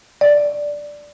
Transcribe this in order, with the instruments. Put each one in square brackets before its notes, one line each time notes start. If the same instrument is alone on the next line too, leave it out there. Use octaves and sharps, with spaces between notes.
[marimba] D5